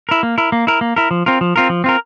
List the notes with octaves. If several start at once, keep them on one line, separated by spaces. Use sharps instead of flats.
E4 A#4
A#3
E4 A#4
A#3
E4 A#4
A#3
E4 A#4
F3
C4 F4 A#4
F3
C4 F4 A#4
F3
C4 F4 A#4